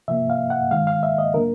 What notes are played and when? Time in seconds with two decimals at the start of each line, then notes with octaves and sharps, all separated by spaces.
0.08 C3 F3 A#3 E5
0.30 F5
0.50 F#5
0.71 D#3 G#3 F5
0.87 F5
1.03 E5
1.18 D#5
1.34 D3 F#3 A#3 A#4